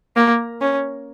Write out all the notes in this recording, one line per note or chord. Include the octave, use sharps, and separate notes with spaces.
A#3
C#4